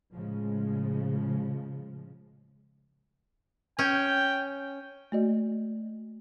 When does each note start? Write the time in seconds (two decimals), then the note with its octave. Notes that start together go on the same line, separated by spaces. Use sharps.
0.13 A2 C#3 F3 G#3
3.79 C#4 G5
5.12 A3 A#3 F#4 D5 D#5